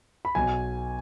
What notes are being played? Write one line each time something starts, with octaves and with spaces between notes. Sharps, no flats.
B5
B1 B2 G#5